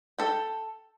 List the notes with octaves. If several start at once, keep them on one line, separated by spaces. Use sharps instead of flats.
A4 G5